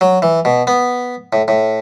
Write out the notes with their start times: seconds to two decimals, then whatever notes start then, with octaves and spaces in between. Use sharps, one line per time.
0.01 F#3
0.22 E3
0.45 B2
0.67 B3
1.33 A2
1.48 A2